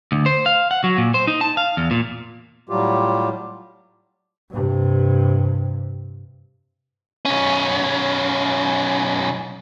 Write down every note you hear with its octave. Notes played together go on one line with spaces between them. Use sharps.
D2
C5
F5
F#5
F#3
A#2
C5
D#4
A5
F5
E2
A#2
A2 F#3 G3 F4 G4
G2 C3
B1 C#4